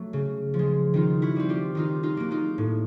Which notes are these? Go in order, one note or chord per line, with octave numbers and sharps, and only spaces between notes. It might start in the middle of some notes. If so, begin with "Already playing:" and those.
Already playing: F#3 A3
C#3
F3
G#3
D#3 D#4 F4
E4 F#4
G3 C4
F4 G4
D#3 D#4 F4
D#4 F4
F#3 A#3
D#4 F4
A2